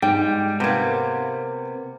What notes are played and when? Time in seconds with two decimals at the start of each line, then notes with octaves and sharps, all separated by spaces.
0.02 G#2 G3 G5
0.60 C3 A#3 B3 G6 G#6